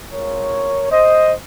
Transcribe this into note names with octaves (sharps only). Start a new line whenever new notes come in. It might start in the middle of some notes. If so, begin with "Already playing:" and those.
G#3 C4 F4 A#4 C#5
C5 D#5